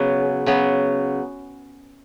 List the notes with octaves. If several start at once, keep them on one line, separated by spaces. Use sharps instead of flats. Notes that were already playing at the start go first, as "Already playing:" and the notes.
Already playing: C#3 F#3 B3
C#3 F#3 B3